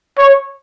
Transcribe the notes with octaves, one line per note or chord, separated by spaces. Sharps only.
C#5